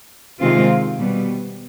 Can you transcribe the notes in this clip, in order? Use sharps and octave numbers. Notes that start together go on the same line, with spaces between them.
C3 D#3 G#3 C4 F4
B2 G3 B3